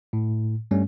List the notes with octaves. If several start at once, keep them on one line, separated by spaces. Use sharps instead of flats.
A2
G2 G3 A3 C#4